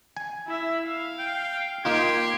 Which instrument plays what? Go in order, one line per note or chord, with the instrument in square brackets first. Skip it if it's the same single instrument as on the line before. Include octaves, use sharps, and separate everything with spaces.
[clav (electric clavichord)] G#5
[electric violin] E4 E5
F5
[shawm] G5
[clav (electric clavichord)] A#3 D#4 F4 [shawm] G4 [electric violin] C6 G#6